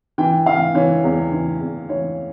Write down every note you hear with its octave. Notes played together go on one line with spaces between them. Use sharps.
E3 G5
E3 F5
E3 C#5
E2
E3
E2
E3 C#5